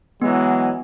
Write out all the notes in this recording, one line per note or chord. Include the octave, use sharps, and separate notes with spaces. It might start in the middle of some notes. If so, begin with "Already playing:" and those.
E3 F#3 G#3 B3